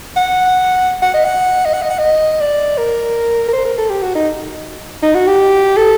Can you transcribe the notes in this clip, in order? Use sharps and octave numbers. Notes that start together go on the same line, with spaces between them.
F#5
F#5
D#5
F#5
D#5
F#5
D#5
F#5
D#5
D5
A#4
A#4
C5
A#4
A4
G4
F#4
D#4
D#4
F#4
G4
A4